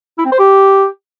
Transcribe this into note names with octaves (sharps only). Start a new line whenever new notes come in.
E4
C4
C5
G4